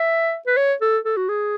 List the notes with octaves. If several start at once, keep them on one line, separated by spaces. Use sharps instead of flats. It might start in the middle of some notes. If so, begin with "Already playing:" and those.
Already playing: E5
B4
C#5
A4
A4
F#4
G#4